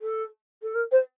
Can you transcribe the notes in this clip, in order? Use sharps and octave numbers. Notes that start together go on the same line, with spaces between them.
A4
A4
A#4
C5